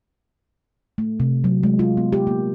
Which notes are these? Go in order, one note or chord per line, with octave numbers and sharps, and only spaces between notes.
A3
C3
F#3
G#3
F4
B3
G4
A#3